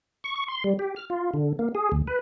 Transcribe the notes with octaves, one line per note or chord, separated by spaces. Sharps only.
C#6
C#6
C6
G3
G4
F6
F4
D3
A#3
G#4
D2
B4